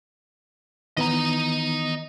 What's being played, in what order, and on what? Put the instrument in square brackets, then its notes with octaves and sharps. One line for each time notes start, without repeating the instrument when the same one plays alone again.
[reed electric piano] D#3 E3 B3 [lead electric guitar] D#5 A#5